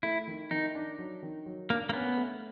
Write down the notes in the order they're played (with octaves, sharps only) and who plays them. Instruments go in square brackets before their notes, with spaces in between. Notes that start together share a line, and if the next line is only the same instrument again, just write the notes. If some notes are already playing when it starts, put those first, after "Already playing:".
[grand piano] A3 [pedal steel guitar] E4
[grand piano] D#3
[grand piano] D#3 [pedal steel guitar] D#4
[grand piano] D4
F#3
D#3
F#3
[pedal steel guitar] A#3 [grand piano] D4
[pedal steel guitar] A#3
[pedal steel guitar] B3 [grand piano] C#4
[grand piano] A3